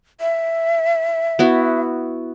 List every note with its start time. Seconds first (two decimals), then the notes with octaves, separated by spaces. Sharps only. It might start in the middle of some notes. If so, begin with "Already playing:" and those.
0.21 E5
1.39 B3 E4 F#4